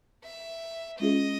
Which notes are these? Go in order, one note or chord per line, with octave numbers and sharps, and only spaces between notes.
E5
G#3 C#4 F4 G#4 D#5